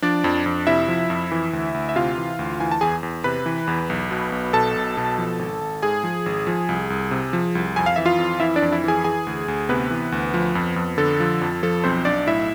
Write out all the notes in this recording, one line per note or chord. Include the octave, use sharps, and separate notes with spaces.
F3 D4 D5
F2
F2
C3 E4 E5
F3
F2
E3
D2
D2
E5
C3 F4 F5
E3
D2
E3 G#5
A5
E2 G#4 G#5
E2
C3 B4 B5
E3
E2
B1
B2
B1
B2 A4 A5
B1
B2
F3
G#1
G#1
G#2 G#4 G#5
F3
G#1
F3
C2
C2
C3
F3
C2
F2 G#5
F5
E3 E5
F4 F5
F2
E3 E4 E5
D4 D5
F2
E4 E5
E3 G#4 G#5
E3 G#4 G#5
D2
D2
C3 B3 B4
E3
D2
F3
F2
F2
D3 A4
F3
F2
F3 A4
B1 C4 C5
B1 D4 D5
A2 E4 E5